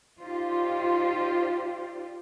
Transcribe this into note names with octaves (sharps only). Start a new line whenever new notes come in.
D#4 F4 G4 C5 D5